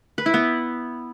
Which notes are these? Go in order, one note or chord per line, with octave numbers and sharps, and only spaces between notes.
B4
E4
B3